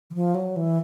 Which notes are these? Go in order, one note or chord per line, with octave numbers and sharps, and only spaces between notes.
E3
F3
F#3
E3